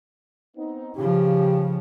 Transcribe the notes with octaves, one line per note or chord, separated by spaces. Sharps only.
B3 C4 D#4
C#3 F3 G4